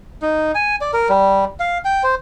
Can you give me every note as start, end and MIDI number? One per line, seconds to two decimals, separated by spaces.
0.22 0.52 63
0.55 0.76 80
0.81 0.91 74
0.93 1.09 70
1.09 1.45 55
1.60 1.78 77
1.85 2.03 79
2.03 2.15 72